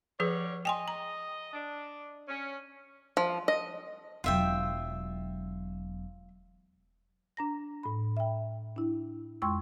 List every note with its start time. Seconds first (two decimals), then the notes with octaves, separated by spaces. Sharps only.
0.20 D3 F3 G3 G#4 B4 C#5
0.65 D#5 G5 G#5 C6
0.88 A#5
1.53 D4
2.28 C#4
3.17 F3
3.48 D#5
4.24 E1 F#3 F4 E5 G5
7.37 D4 A#5 A#6
7.83 A2 B5
8.17 E5 G5
8.76 D4 E4
9.42 F2 G#3 G5 C6 C#6 E6